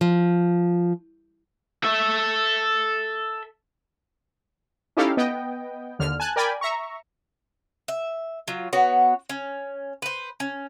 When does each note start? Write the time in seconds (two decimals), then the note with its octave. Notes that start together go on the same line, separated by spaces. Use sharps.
0.01 F3
1.84 A4 E5
4.97 C#4 D#4 E4 G4 A4 F5
5.17 B3 D#5 G5
5.99 D#2 D3 F6
6.20 G#5 A5 F#6
6.36 A#4 D5 G5 G#5 B5
6.61 E5 A#5 C#6
7.88 E5
8.48 F#3 F4
8.73 B3 F#4 C#5
9.30 C#4
10.02 B4 C5
10.40 C#4